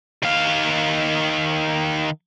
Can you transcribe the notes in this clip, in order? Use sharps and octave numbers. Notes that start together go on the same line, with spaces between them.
D#3 F5